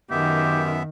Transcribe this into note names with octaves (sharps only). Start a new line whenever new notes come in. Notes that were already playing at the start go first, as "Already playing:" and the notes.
F#2 D#3 B3 G4 E5